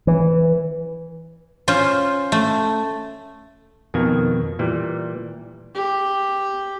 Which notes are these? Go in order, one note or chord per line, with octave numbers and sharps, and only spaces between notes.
E3
C#4 F4 C5
A3
F2 B2 D#3 A#3 G#5
A#2 E3 G3
G4